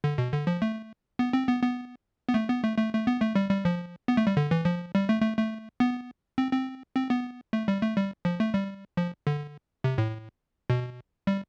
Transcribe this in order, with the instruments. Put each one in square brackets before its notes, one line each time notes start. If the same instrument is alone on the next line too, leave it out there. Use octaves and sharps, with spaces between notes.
[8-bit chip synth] D3
B2
D3
F3
A3
B3
C4
B3
B3
B3
A3
B3
A3
A3
A3
B3
A3
G3
G3
F3
B3
A3
G3
D3
E3
F3
G3
A3
A3
A3
B3
C4
C4
C4
B3
A3
G3
A3
G3
F3
A3
G3
F3
D3
C3
A2
B2
G3